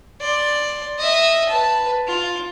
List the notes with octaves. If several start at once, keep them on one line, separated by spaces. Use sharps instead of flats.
D5 C6
D#5 E5
B4 A5
F4